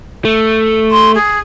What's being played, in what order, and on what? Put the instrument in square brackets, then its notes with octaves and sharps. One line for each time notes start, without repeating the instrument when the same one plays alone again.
[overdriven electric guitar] A3
[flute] C6
G#4